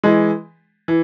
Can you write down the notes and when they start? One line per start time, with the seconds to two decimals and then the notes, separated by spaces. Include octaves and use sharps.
0.04 E3 G#3
0.88 E3